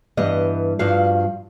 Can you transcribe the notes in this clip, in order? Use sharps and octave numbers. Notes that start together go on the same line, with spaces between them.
G2 E3 G3 B3 D#5
G2 F3 F#4 F5